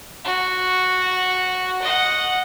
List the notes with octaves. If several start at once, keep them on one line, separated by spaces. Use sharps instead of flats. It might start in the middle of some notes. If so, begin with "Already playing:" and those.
F#4
D#5 F#5